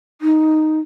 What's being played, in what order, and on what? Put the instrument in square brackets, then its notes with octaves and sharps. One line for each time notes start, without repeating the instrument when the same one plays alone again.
[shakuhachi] D#4